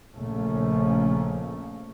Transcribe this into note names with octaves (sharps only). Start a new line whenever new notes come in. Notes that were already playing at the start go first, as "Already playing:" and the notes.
A#1 C#3 F3 A3 A#3 C#4